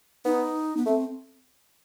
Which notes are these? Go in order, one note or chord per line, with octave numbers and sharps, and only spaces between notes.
B3 D#4
B3
A3 C4